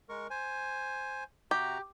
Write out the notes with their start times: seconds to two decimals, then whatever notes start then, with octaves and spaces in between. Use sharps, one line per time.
0.09 G#3 A#4 C#6
0.30 C5 G#5
1.51 C3 F#4 G4 A#5